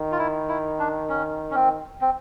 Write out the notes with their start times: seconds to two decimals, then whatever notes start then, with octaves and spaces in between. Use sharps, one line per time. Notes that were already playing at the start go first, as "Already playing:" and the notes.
Already playing: D#3
0.12 F4
0.18 E4
0.49 E4
0.79 D4
1.09 C#4
1.51 C#4
1.55 C4
2.01 C4